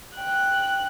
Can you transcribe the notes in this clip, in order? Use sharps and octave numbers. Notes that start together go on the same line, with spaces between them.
G5 F#6